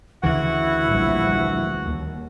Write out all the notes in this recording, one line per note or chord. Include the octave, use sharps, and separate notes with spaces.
D2 C#3 E3 E4 F#4 F#5
A#1 F3 G3
D#2